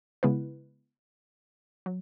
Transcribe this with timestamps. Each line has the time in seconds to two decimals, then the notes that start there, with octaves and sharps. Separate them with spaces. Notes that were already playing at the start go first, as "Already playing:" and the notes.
0.23 C#3 G#3 B3 E4 B4
1.86 F#3